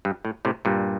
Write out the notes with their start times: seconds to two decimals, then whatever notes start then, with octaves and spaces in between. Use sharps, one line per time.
0.05 G2
0.25 A2
0.45 A2 C3
0.65 G2 A#2